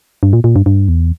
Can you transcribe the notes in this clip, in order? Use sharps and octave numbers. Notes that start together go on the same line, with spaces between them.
G2
A#2
A#2
G2
G2
E2